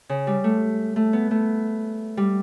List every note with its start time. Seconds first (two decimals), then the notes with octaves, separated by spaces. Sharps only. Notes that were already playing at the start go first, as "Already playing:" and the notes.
0.09 C#3
0.27 G3
0.44 A3
0.96 A3
1.13 B3
1.31 A3
2.17 G3